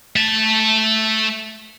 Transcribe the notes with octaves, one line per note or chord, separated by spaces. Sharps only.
A3 A5